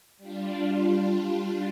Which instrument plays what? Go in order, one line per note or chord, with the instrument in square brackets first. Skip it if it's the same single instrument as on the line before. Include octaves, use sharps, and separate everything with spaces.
[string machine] G3 D4 F4